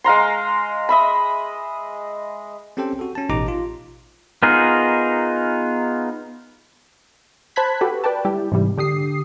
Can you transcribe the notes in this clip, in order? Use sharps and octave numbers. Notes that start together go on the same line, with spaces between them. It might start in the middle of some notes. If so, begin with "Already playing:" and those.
G#3 F5 A#5 C6
D#5 E5 B5
C4 C#4 G4 A4 C5 G5
F#4 A4
C#4 A5
A1 B2 D#4 G4 A#5 D6
F4
B3 D#4 F4 G#4 A#4
C5 A5 B5 F#6 G#6 B6
F#4 G4 A4 B4
B4 D5 G5 A5
G3 E4 G4
G#2 C3 E3 G3
D3 G4 D#6 C7